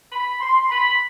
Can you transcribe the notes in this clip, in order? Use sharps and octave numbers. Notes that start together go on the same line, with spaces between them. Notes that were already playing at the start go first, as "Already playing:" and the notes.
B5
C6
B5